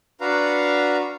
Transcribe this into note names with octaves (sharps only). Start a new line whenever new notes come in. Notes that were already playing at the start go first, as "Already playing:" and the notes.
D4 F#4 B4 F5 A#5